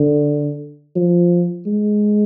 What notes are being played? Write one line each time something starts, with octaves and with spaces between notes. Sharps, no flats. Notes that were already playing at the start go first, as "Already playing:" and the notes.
Already playing: D3
F3
G#3